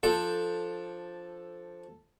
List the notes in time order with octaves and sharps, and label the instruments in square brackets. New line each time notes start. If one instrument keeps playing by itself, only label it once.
[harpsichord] F3 D4 G5 [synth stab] A4